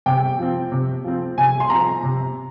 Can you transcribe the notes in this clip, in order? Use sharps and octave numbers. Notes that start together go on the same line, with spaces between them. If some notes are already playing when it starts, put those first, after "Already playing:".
C3 G5
F3 C4
C3
F3 C4
C3 G#5
C6
F3 C4 A#5
C3